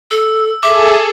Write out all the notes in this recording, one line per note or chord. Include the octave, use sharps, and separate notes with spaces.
A4 E6
G#4 A4 E5 D6